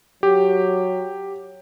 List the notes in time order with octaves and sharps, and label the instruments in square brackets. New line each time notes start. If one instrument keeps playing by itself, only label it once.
[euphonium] F#3 [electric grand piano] G4